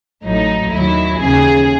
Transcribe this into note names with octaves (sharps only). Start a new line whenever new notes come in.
A1 A2 F#3 D#4
D#2 D#3 F#3 E4
D#2 C#3 E3 G#4